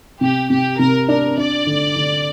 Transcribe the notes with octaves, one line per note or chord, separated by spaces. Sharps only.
C3 G4
C3 G4
C3 A#4
D4 A#4
D4 D5
D3
D3